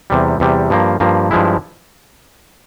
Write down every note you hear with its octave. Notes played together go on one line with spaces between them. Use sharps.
E2 C3 G3
E2 C3 G3
G2 F3 A#3
G2 F3 A#3
G2 F3 G#3 E4